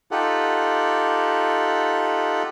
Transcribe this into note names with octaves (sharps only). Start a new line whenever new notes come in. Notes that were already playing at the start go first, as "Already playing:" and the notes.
D#4 F4 G4 A4 F#5